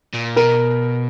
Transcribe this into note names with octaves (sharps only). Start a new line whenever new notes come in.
A#2
B2 A#4